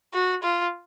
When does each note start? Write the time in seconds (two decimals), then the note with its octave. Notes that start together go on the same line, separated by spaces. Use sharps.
0.14 F#4
0.43 F4